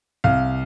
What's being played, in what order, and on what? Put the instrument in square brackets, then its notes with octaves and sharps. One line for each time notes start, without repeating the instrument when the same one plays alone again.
[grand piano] C2 F5